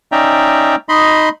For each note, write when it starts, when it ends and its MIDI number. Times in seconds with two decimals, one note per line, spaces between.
0.12 0.75 61
0.12 0.75 63
0.12 0.75 74
0.12 0.75 76
0.12 0.75 79
0.12 0.75 82
0.89 1.29 63
0.89 1.29 75
0.89 1.29 83
0.89 1.29 84